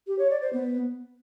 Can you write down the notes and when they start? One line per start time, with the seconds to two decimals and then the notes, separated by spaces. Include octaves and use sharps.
0.07 G4
0.19 C#5
0.30 D5
0.42 C5
0.53 B3